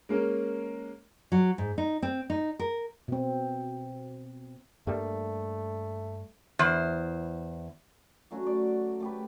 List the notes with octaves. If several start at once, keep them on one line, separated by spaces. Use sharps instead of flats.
G#3 A#3 C#4 A#4
F#3
G#2
D#4
C4
D#4
A#4
B2 C4
G2 G3 A3 A#3
E2 C5
F#3 A3 C#4 F#4
D5
A3 G4 B4